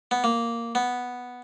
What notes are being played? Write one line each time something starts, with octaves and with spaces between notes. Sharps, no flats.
B3
A#3
B3